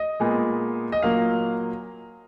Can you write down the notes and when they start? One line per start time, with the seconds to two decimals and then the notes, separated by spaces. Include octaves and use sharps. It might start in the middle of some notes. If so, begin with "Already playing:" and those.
Already playing: D#5
0.20 A#2 G#3 B3
0.92 D#5
1.02 A#2 F#3 A#3 F5